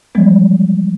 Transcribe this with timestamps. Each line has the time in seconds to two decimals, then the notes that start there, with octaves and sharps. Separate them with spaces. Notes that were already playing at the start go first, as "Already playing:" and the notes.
0.15 E3 F3 G3 G#3 B3